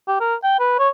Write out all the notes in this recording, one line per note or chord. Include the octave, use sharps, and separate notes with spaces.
G4
A#4
G5
B4
C#5